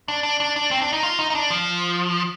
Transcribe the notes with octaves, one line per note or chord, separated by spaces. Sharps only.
D4
D4
D4
D4
C4
D4
D#4
F4
D#4
D#4
D4
F3